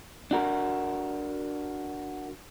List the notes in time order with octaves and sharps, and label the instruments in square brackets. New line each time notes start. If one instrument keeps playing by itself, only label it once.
[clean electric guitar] D4 F#4 A#4